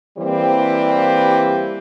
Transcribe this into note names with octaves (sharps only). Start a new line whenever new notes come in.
E3 G3 A#3 C4 G4